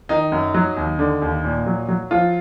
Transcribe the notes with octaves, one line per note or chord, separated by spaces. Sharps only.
D#3 D#4
F#2
F#3
D#2
D3
D#2
A#2
F#3
F#3
F3 F4